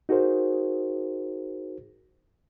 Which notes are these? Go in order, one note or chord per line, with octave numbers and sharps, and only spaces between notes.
D#4 F#4 G#4 A#4 C5